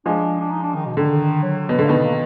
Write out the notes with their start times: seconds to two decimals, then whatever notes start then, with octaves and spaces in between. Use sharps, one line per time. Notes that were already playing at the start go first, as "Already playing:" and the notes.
0.06 F3 G#3 D4
0.41 D4
0.51 D#4
0.63 D4
0.75 D#3
0.86 B2
0.97 D3 D#3
1.43 F#3
1.69 B2
1.79 D3
1.84 A#3
1.88 B2 D#3 B3
2.04 A#3